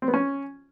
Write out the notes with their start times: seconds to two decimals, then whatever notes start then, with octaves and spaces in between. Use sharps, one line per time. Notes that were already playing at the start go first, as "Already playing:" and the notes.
0.02 C4
0.08 B3
0.14 C#4